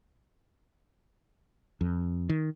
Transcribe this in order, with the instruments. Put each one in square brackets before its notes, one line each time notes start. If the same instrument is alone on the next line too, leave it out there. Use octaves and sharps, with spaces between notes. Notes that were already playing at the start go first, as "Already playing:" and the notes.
[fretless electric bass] F2
D#3